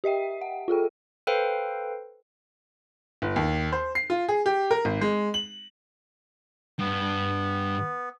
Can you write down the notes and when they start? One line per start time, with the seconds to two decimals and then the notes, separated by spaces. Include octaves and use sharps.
0.04 G4 D#5 E5 G5
0.41 F#5
0.68 F4 G#4 A4 G5
1.27 A4 B4 C5 F5 G5
3.22 G1
3.36 D#2
3.72 C5
3.95 C7
4.10 F4
4.28 G#4
4.46 G4
4.71 A#4
4.85 G#1
5.01 G#3
5.34 F#7
6.79 G2 B3